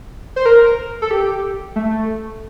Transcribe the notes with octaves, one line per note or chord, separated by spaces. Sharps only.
C5
A#4
A4
G4
A3